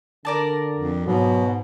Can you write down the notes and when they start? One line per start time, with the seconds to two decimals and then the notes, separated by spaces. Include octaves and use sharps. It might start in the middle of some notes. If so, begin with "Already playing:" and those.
0.25 D3 A#4 D5 A5
0.75 F2
1.06 G#2 B2 F#3